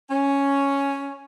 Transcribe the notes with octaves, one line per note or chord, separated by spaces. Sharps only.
C#4